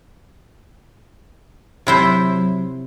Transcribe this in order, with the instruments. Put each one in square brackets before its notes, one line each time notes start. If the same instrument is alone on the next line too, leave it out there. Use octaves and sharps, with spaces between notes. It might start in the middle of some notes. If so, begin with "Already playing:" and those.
[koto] C3 E4 C5 [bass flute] F#3